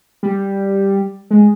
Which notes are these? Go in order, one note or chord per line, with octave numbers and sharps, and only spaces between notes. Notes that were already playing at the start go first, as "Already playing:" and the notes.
G3
G#3